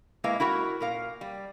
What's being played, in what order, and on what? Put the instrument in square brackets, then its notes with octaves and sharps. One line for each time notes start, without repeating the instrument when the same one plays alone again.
[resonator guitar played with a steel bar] G#3 A#3 E4 B4 F5
E4 F#4 A#4 F#5
A#2 A#4 F5
G3